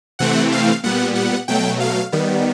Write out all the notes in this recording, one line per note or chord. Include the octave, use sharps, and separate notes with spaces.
C3 E3 A3 C4 F#5
F5
A#2 G3 B3 F#5
F#5
B2 F#3 A3 G5
F5
D#3 G3 B3